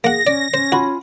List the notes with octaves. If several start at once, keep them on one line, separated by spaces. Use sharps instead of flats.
A#3 G#4 F#5 A#6
C#4 D5
C#4 C5
F4 F#4 G#5 B5